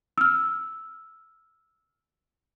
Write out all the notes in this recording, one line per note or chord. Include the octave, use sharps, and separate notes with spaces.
E6 F6